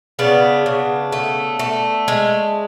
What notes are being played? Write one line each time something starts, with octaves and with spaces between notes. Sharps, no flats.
C#3 B3 D4
C#3
A3
A3
G#3